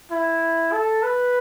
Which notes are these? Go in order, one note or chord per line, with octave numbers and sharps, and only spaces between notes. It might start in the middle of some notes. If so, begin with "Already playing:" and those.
E4
A4
B4